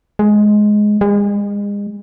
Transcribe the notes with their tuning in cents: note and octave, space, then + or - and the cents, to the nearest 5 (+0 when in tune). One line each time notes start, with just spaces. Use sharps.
G#3 +10
G#3 -35